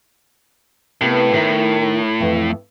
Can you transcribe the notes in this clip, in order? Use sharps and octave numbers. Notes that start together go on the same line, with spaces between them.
A2 C3 A#3 B3
A2 D#3 E4 A#4
F2 E3